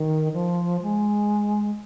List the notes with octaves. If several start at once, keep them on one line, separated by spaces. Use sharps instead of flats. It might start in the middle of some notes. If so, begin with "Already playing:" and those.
Already playing: D#3
F3
G#3